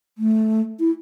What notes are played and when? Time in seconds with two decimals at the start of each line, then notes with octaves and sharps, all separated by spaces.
0.18 A3
0.80 E4